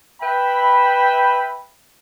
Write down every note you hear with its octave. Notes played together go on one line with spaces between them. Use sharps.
B4 E5 G5 B5